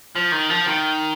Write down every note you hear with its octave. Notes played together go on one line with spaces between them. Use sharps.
F3
D#3
F3
D#3